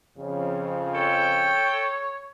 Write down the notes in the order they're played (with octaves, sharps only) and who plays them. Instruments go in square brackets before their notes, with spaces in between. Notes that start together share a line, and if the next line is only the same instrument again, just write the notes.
[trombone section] F2 C#3
[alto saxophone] A4 [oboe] C#5 [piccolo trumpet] G5